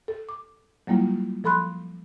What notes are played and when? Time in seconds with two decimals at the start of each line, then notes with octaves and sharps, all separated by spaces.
0.08 A4
0.29 D6
0.87 F#3 G3 A#3 E4 F4
1.44 F3 A4 B5 C6 F#6